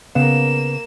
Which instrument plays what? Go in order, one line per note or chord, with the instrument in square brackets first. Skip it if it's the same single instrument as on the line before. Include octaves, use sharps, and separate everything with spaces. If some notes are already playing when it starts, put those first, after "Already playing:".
[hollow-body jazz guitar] C#3 B3 F5 [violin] A#3 E7